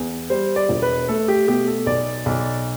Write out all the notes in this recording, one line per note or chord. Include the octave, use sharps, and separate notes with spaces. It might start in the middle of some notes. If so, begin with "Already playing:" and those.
Already playing: E2
G3 C5
D5
E1
B4
A3 A4
G4
B2 G4
A4
B1 D5
B1